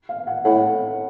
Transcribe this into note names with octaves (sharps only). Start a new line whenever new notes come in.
F5
F#5
A2 F#5